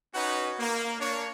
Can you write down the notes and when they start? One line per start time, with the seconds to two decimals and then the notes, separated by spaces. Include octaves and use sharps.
0.15 C#4 D#4 F#4 B4 C#5 F#5
0.59 A#3
1.00 A#3 D4 C#5